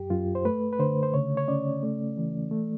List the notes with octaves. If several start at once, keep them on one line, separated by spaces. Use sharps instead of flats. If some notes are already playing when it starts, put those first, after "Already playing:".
Already playing: F#2 G4
F#2 F4
C5
A3 B4
B4
D3 C5
C5
C#3 C#5
C#5
C#4 D5
A3
E3
A3